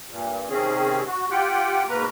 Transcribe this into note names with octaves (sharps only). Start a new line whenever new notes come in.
G2 A#2
C3 D#3 C4 C#4 G#4
F#4
F4 G4 F#5 G5
G#2 B2 A#3 A#4 B4 A#5